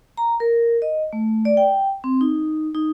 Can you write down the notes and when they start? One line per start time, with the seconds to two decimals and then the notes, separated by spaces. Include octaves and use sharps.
0.17 A#5
0.40 A#4
0.82 D#5
1.13 A3
1.45 D5
1.57 G5
2.04 C4
2.21 D#4
2.75 D#4